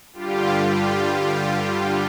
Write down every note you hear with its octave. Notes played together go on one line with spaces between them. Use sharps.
G2 D3 G3 F4 G4
F4 G4